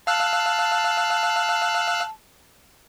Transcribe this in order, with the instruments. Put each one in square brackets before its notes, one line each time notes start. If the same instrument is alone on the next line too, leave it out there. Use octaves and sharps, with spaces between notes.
[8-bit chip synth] F5 E6 F#6 [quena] A5